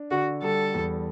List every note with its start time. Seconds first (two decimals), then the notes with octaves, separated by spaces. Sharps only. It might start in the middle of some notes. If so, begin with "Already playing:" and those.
Already playing: D4
0.11 D3 F#4
0.42 G3 A4
0.74 E2